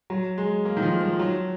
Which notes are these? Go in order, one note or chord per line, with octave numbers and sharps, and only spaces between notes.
F#3
G#3
A#3
D#3
F3
F3
F#3